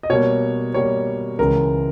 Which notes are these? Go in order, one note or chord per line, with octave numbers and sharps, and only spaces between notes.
D#5
B2 G3 A#3 C#5
B2 G3 A#3 C#5
C#2 C#3 E3 G#3 A#4